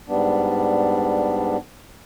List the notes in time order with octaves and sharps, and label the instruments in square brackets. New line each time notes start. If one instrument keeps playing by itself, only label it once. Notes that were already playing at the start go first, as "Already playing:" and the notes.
[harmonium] G#2 G3 B3 D4